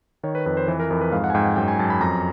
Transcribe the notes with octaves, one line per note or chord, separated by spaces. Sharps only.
D#3 C#5
B4
F2 B4
C5
E3 B4
A#4
F2 A#4
B4
G#2 F5
F#5
G#5
G#2 G5
F#2 G5
G#5
F#2 A5
B5
F2 A#5